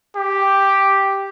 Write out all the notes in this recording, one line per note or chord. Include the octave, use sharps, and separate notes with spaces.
G4